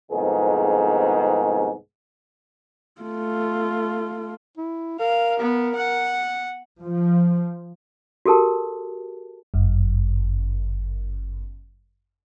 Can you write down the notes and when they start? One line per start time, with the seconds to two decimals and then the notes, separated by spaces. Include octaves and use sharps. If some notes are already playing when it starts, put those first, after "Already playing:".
0.12 C2 F2 G#2 D#3 B3 G#4
3.02 A3 F4
4.57 E4
4.99 A#4 F5
5.40 B3
5.75 F#5
6.83 F3
8.25 F#4 G4 A4 A#4 A5
9.54 G1 F#2